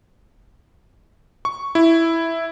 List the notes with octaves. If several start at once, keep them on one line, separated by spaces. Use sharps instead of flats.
C#6
E4